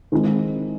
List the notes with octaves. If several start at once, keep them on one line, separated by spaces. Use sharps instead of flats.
D#3 G#3 C4 E4